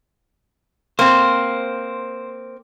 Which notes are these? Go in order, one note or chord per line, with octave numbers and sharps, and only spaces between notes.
A#3 C4 C5